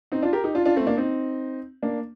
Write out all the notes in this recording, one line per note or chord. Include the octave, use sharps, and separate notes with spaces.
C4 D#4
D4 F4
G4 A#4
D#4 G4
D4 F4
D4 F4
A3 C4
A#3 D4
C4 D#4
A#3 D4